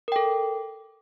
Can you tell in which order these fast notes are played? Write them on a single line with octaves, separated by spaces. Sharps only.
A#4 G5 A4